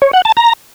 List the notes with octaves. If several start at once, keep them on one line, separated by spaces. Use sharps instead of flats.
C#5
F#5
A5
A#5